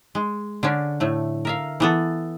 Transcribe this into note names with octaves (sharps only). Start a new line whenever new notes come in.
G#3
D3 C#4 D4
A2 A3
A#4 E5 F5
E3 B3 A4